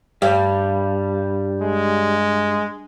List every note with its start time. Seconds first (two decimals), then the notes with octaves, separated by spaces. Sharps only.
0.22 G2 G3
1.62 G#3